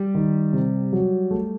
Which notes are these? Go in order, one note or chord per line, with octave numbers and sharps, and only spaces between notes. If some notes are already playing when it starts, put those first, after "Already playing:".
Already playing: G3
D#3
C3
F#3
A3